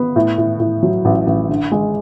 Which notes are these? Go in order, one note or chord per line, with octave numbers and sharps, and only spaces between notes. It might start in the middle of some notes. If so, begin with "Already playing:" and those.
Already playing: B3
A2
A2
A2
F#3
A1
A1
D3
G#3